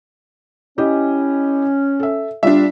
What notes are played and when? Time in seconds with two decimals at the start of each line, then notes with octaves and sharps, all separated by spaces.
0.78 C#4 E4 G4 D#5
2.00 A4 E5
2.43 G3 D4 F4 D5 E5